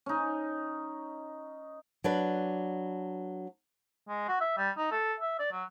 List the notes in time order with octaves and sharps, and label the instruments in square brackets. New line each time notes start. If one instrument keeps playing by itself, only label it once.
[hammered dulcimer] C#4 D#4
[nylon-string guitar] F#3 D4 B4
[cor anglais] G#3
F#4
E5
G3
D#4
A4
E5
D5
F#3